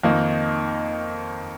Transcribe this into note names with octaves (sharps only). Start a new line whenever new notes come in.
F2 D#3 A#3 D#4